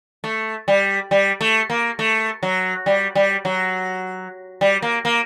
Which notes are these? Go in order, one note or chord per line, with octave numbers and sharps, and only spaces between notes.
A3
G3
G3
A3
A#3
A3
F#3
G3
G3
F#3
G3
A#3
A#3